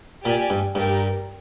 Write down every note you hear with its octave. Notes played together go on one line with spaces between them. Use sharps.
A#2 G4 D5 G#5
G2
G2 G4 A#4 D5